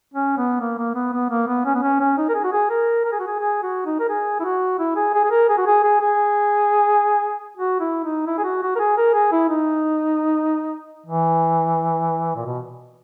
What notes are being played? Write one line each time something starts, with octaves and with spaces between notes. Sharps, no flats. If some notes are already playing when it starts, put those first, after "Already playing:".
C#4
B3
A#3
A#3
B3
B3
A#3
B3
C#4
B3
C#4
C#4
D#4
A#4
G#4
F#4
G#4
A#4
A#4
G#4
F#4
G#4
G#4
F#4
D#4
A#4
G#4
E4
F#4
E4
G#4
G#4
G#4
A#4
G#4
F#4
G#4
G#4
G#4
F#4
E4
D#4
E4
G#4
F#4
F#4
A#4
G#4
A#4
G#4
E4
D#4
E3
A#2
B2